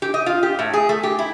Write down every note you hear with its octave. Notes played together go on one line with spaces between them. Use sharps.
G4
D#5
F4
G4
A2
G#4
A3
G4
E4